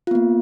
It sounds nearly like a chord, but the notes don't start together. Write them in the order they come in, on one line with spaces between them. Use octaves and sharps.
F4 B3 A#3